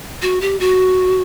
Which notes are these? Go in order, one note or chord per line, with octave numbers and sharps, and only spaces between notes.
F#4
G4
F#4